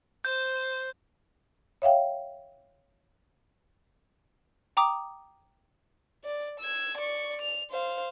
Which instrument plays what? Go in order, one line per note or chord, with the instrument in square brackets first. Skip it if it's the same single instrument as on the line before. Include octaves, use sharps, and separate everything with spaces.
[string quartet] C5 [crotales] G6
[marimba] C#5 E5 F5 G5
[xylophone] G5 A#5 D6 D#6
[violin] D5
E6 G#6
D5 C#6
F7
C5 F5